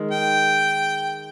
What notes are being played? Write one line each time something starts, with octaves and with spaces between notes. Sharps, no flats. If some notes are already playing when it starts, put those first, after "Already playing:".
Already playing: D#3 G#3
G5